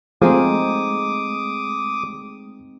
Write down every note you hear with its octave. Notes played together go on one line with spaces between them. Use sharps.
F3 G#3 A3 C4 D#4 G#4 D6 D#6